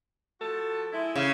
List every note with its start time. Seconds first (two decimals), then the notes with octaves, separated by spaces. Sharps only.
0.41 F3 F#4 A4
0.92 G#3 E4
1.16 C#3